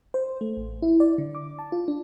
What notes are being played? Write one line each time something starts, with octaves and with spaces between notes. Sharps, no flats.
C5
A3
A1
E4
D5
D3
D6
A5
F4
D4